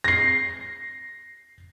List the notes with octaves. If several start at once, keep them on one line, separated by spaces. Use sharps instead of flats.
A#6 C7